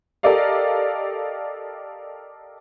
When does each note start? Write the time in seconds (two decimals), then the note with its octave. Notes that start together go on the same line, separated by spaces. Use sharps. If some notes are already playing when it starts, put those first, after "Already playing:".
0.23 G4 A4 A#4 D5 D#5 F5